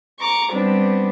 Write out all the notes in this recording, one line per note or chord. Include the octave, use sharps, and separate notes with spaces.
A#5 C#6 D6
G3 B3 C4 D4